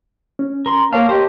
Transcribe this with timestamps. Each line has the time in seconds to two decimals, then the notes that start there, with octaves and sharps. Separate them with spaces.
0.39 C#4
0.66 A#4 C6
0.93 A#3 A#4 C#5 F5 A5
1.09 G4 C5 D#5